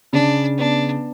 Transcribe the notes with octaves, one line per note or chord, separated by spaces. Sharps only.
C#3 D4
B3 D4